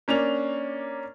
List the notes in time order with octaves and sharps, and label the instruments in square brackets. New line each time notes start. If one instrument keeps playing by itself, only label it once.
[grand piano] A#3 C#4 D4 F7